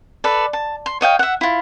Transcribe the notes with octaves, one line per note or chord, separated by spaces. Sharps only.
A4 B4 D5
A5
C6
C#5 D#5 F5 G5
E5 F#5
E4 F4